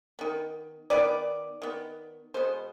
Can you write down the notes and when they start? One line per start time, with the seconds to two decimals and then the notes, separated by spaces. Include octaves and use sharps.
0.19 D#3 B3
0.90 D#3 B3 B4 D5
1.62 D#3 B3
2.34 B2 G#3 B3 C5